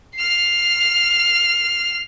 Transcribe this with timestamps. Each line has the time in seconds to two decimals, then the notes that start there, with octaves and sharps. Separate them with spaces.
0.16 F6 C7